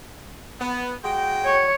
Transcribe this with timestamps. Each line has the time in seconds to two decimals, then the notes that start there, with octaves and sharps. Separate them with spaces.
0.60 B3
1.03 G#3 F#4 G5
1.45 C#5